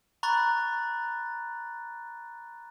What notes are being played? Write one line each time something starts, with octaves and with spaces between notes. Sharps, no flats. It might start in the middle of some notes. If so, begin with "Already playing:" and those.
A#5 B5 C#6 F#6 A6